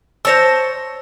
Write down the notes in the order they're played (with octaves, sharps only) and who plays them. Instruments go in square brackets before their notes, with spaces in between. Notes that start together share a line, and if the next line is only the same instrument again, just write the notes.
[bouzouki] C5 C#5 A5 [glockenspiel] E6 A#6